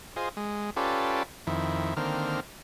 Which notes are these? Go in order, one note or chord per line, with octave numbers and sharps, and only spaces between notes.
F4 G#4 C5 D#5
G#3
C#4 F4 G4 A4 B4 D5
F2 D#3 E4
D3 D#3 A#3 C4 F6